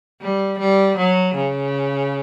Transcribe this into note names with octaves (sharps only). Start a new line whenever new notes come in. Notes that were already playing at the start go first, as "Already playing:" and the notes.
G3
G3
F#3
C#3